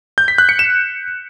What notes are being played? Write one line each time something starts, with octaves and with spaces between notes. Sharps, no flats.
G6
B6
F#6
C#7
E7